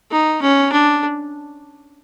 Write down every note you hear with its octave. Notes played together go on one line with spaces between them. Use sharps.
D#4
C#4
D4